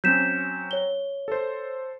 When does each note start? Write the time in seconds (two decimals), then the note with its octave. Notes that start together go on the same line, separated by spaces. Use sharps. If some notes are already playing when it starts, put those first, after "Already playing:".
0.04 F#3 C4 C#4 G6 B6 E7
0.71 C#5 G7
1.28 A4 C5